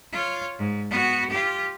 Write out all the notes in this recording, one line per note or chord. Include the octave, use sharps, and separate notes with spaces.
F4 C#5
G#2
B3 F#4
F4 G4